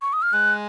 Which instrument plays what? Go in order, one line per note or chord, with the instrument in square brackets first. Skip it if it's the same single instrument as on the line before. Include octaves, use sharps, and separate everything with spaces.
[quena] C#6
D#6
F6
[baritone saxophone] G#3 [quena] F#6